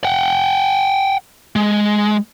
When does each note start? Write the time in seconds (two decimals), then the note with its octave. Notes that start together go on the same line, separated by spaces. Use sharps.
0.04 F#5 G5
1.56 G#3